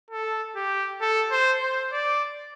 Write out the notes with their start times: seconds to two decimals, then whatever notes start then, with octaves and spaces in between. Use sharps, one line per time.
0.10 A4
0.56 G4
1.01 A4
1.32 C5
1.62 C5
1.93 D5